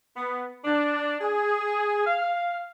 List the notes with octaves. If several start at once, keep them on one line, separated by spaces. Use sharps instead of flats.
B3
D4
G#4
F5